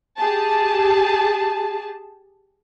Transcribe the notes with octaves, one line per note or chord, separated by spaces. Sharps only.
G4 G#4 A5